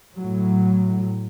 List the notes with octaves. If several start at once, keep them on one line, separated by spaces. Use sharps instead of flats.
A2 F#3